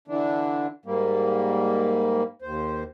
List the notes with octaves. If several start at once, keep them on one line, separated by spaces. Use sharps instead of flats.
D3 E3 D4
G#2 G3 A#3
D#2 C5